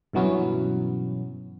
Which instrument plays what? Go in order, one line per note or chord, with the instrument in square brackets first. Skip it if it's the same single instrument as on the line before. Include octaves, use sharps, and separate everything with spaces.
[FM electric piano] G2 B2 E3 F#3 B3 C#4